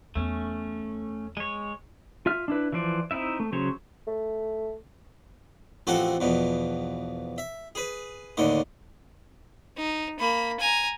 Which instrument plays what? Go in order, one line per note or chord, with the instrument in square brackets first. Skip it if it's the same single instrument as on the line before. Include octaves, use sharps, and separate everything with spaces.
[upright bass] E2 [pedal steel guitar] A3 C#4
[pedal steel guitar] G#3 C#5
F4 E5 F6
D4 E4 B4
E3 F3 C5 D5
C4 D#4 E4 E5
A3
C#3 F#3 C5 C#5
[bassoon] A3
[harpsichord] A1 F3 C4 F#4 A4 A5
E2 B2 F3
E5
G#4 B4
D#2 A2 D3 D#5
[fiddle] D#4
A#3 B5
G#5 A#5